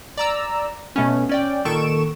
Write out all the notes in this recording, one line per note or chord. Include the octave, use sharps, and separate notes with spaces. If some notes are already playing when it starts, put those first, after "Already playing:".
D5 A#5 E6
B2 A3 B3 C#4
C#4 D5 G5
A#2 D#3 A4 C#6 D7 E7